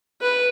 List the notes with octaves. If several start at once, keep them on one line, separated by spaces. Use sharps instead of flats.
B4